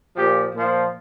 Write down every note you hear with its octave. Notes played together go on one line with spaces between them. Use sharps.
A#2 F3 G4
A#2 F3